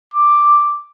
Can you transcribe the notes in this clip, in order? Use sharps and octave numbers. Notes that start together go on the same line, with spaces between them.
D6